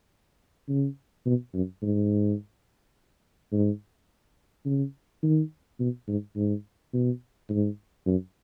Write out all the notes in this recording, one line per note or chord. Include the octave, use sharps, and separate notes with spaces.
C#3
B2
F#2
G#2
G#2
C#3
D#3
B2
G#2
G#2
B2
G#2
F#2